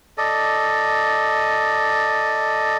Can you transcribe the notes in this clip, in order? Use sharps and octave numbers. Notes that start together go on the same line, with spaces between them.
A4 D5 D#5